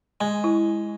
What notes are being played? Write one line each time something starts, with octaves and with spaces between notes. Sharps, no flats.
G#3 G#5
E4